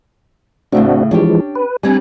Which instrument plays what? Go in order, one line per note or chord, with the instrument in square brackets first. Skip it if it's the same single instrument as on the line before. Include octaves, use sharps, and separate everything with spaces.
[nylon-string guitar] A2 C#3 A3 [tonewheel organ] C4 D4 F#4
[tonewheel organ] E3 F3 G#3 [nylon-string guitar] C#4 D4 G4
[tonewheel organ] B4
[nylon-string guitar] G3 C4 D4 [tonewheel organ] G#5